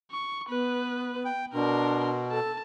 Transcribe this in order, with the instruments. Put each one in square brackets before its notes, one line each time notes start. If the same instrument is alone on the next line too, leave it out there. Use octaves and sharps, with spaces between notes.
[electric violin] C#6
[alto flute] B3 [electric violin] B4
[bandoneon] G5
[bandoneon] B2 [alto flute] D4 [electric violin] A#4 C6
[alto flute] A4 [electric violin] A5